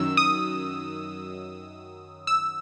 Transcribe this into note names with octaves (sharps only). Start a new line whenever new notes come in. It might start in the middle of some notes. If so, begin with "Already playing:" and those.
Already playing: F#2 D#3 F#3 E6
D#6
E6